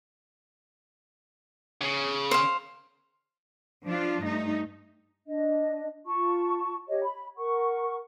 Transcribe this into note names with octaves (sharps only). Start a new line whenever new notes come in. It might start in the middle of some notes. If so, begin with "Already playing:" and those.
C#3
C5 F5
F3 D4 F4
G2 A3 D#4
D4 D#5
F4 A5 C#6
G4 C#5 D#5
B5
A#4 F#5 C#6